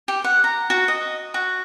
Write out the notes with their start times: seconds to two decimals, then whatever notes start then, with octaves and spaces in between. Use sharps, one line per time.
0.08 G4
0.24 F#5
0.44 A#5
0.70 F#4
0.88 D#5
1.34 F#4